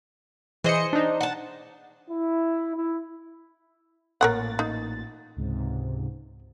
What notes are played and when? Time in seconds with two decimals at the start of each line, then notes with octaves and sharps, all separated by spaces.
0.64 E3 G#4 C5 D#5 C#7
0.93 D4 D#4
1.21 F#5 A5
2.09 E4
2.77 E4
4.21 A1 A#2 A#4 C#5 F#5 A6
4.59 D#4
5.36 C#2 G#2 C3